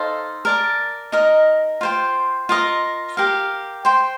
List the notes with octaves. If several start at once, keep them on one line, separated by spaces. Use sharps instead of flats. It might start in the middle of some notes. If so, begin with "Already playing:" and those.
Already playing: D#4 A4 C5 F5
A#4 D5 A5
D#4 A#4 D#5
F4 C5 G5
F4 A#4 D#5
G4 A#4 F5
C5 G5 C6